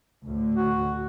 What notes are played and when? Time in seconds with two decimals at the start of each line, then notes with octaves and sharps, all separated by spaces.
0.24 D2 A2 D3
0.55 F#4